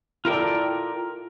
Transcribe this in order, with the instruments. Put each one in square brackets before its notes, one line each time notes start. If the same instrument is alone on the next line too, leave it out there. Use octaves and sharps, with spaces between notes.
[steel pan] E4 A4 D5 [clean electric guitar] F4 A#4 G5